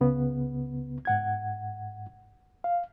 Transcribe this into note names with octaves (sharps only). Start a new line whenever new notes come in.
C#2 C#3 B3
G#2 F#5 G#6
F5